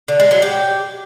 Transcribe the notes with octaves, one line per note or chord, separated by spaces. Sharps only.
D3
G#3
F#3
G4